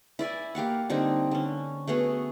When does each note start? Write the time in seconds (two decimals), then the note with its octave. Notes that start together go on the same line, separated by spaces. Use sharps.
0.19 E4 D5 E5 G#5
0.55 A#3 G4 F5 F#5
0.90 D3 G3 C4 D#4
1.31 D3 C#4
1.87 A3 B3 F#4 G#4